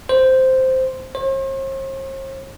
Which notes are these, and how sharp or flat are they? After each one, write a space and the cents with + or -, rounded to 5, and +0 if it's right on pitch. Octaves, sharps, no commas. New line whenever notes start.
C5 -5
C5 +45